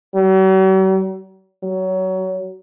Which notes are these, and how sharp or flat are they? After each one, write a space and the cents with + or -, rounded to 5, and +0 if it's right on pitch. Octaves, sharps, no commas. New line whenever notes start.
F#3 +45
F#3 +20